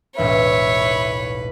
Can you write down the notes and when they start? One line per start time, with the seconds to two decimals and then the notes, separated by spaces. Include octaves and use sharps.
0.18 E1 B1 A2 B4 C#5 E5